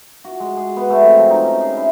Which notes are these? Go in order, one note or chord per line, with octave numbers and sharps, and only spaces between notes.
F#4
G#3
G#4
B3
A3
C4
F3
D#4
C#4
G#4
E4